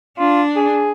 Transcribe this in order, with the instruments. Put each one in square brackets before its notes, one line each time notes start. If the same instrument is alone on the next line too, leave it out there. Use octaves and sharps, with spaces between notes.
[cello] D4 [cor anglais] F4
[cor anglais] G#4